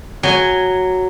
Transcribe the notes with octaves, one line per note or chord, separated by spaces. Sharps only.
F#3 G#5